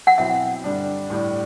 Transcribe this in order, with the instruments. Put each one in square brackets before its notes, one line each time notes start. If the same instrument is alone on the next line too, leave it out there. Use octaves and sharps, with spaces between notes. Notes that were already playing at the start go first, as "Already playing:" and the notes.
[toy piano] F#5
[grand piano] B2 F#3 C4 E4 [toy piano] E5
[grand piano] G2 D3 G3 D4
A2 G3 D4